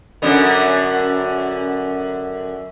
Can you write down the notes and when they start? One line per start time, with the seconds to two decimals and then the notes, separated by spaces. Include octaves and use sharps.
0.22 F#2 D3 B3